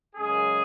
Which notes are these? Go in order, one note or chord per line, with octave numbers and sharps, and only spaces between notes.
F#2 C#3 G#3 C#4 G#4